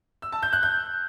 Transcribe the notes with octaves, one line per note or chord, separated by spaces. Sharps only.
E6
A5
G6
F#6
G6